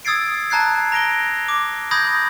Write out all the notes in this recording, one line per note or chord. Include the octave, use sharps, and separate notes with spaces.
D#6 E6 G#6 A6 C7 D7
A5 A#5 F#6 G#6 C7
A#5 A#6 D7 G7
D6
B5 D#6 G6 G#6 A#6